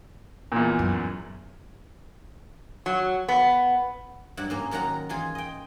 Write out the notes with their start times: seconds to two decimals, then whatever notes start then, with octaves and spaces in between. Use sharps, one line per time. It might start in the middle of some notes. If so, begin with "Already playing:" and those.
0.52 E2 A#2
0.79 F#2
2.86 F#3
3.28 B3
4.37 G2 F#3 E4 F#5
4.50 G#2 A#3 C#4
4.71 G#2 D#3 F#3 A#4 F#5 A#5
5.09 E3 F4 G#4
5.35 D#5 G5